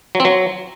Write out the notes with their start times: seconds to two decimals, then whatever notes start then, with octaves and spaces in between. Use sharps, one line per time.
0.15 F#3
0.20 C4
0.25 F#3